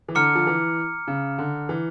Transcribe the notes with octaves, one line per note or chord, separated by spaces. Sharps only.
E3
D3 A#5 D6 F6 C#7
F3
E3
C#3
D3
E3